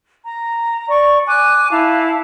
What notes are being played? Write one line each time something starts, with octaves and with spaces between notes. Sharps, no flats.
A#5
D5 C#6
G#5 D6 F#6
E4 F5 A5